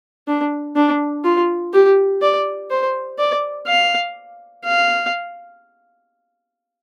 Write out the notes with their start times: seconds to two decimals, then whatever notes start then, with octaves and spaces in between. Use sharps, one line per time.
0.28 D4
0.76 D4
1.25 F4
1.73 G4
2.22 D5
2.71 C5
3.19 D5
3.67 F5
4.65 F5